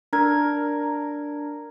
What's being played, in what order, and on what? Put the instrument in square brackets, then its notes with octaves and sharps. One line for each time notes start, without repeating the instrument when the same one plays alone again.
[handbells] D4 G#6 [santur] A#4